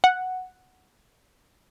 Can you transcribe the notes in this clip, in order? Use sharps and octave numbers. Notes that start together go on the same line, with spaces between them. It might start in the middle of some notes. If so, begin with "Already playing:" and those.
F#5